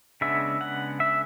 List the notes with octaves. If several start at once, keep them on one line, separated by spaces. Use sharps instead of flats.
C#3 G#3 B3 D4 E5
F#5
E5